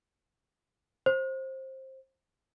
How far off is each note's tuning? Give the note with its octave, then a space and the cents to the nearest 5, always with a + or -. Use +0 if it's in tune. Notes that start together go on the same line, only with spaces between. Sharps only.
C5 +20